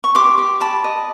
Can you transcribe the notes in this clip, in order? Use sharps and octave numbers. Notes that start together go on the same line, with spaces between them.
C#6
G4 C6 D6
G4
G4 A5 B5
D#5